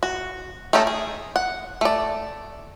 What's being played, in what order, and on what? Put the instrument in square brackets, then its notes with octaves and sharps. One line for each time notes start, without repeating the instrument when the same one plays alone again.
[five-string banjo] F#4
A3 C#4 D#4 G4 A4
G#4
F#5
A3 D5